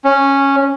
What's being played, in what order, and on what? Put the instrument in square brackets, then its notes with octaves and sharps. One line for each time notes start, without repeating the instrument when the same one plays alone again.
[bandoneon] C#4